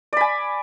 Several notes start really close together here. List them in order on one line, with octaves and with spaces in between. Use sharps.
D5 B5 G#5